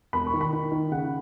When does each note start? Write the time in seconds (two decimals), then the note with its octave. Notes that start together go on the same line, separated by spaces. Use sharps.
0.13 E1 B5
0.27 C#6
0.33 D#3
0.41 B5
0.53 D#3
0.72 D#3
0.92 C#3 F#5